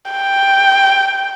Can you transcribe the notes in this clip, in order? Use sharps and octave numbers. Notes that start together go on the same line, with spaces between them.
G5